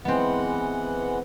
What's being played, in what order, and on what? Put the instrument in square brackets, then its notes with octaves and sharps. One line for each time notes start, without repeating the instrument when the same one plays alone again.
[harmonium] E3 G#3 F#5 [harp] B3 C4